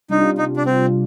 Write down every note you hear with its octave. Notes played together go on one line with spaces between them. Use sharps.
C3 G3 D4 D#4 F4
D#4
D4
C4